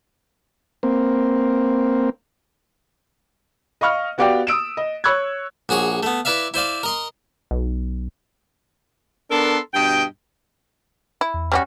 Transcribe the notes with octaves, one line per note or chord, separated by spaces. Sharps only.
A#3 C4
D#5 F5 C#6 F6
B3 F#4 G4 D5 F5 G5
D#6 E6 D7 E7
D#5
C#5 C#6 E6 F#6 G#6
A#1 F#4 G#4 C#5 C#6
A3 B3
E4 B4 D5 E5 F5
E4 C5 D5 F5
A#4 D#5 C6
B1
B3 D4 A4 A#4 C6
G2 B2 D#5 G5
E4
E2
G3 C#4 F#4